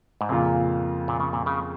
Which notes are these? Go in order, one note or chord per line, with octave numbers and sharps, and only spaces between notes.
G#2
F2 A#2 C#3 A#3 F4
A#2
C#3
A#2
C#3